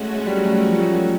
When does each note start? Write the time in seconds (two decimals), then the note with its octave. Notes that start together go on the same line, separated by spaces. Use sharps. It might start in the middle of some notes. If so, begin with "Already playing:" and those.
Already playing: G#3 A3 C#4 F#4
0.15 G#3
0.26 G3
0.37 F#3
0.51 G3
0.66 F3
0.79 F#3